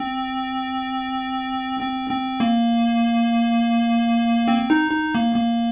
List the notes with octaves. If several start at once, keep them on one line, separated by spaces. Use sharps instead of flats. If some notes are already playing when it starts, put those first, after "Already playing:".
Already playing: C4
C4
C4
A#3
C4
D#4
D#4
A#3
A#3